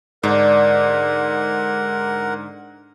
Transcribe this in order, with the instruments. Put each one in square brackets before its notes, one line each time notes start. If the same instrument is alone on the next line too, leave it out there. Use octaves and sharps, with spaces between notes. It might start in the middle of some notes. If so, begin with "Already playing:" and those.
[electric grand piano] G#2 [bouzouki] D3 [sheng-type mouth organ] A#4 F#5